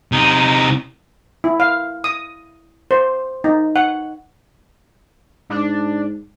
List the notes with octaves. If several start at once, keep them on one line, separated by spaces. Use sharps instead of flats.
C3 D#4
E4
F5
D#6
C5
D#4
F#5
G#2 D4